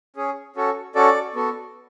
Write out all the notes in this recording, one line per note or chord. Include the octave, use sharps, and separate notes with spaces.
C#4 G#4
C#4 F#4 A4
C#4 F#4 A4 D5
B3 F#4 A4